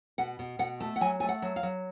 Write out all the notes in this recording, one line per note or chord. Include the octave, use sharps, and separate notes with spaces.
B2 F#5
B2
B2 F#5
A3 A5
F#5
F#3 G#5
A3 G#5
F#5
F#3
F5
F#3